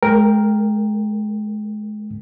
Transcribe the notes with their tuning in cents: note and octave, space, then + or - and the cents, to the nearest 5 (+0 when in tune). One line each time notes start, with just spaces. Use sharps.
G#3 +30 A#4 +0 G5 +10